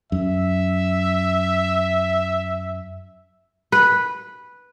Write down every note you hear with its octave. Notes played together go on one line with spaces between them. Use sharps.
F#2 E5
B4